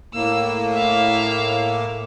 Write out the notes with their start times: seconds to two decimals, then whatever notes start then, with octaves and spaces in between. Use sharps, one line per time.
0.14 A2 A#3 E6
0.74 E5 F5